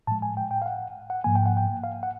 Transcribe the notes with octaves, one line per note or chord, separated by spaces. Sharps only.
A2 F3 G#3 A5
G#5
G5
G5
F5
F#5
F#5
G#2 F3 A#3 G#5
G5
F#5
G5
F5
F#5